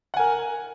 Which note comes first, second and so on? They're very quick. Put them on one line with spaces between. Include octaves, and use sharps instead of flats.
F#5 G#5 A#4